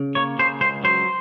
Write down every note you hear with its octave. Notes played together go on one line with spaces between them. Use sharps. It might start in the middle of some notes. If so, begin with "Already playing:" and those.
Already playing: C#3
A#3 C#5
C#3 C5
C#2 C5
F#3 C5